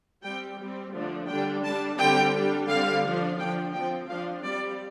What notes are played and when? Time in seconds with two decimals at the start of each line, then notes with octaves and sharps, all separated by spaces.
0.22 G3 C4 G5
0.58 G3 C4
0.93 D3 F3 A3 D4
1.27 D3 G3 D4 G5
1.63 G3 D4 A5
1.98 D3 G3 C4 G5
2.34 G3 D4
2.68 D3 G3 C4 F5
3.03 F3 D4
3.38 D3 F3 D4 G5
3.73 F3 C4 G5
4.08 F3 D4 F5
4.44 G3 C4 D5